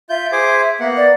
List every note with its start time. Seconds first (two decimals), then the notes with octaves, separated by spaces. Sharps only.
0.09 F4 E5 G6
0.32 G#4 C5 D6
0.80 A#3 B3 F#5
0.97 D5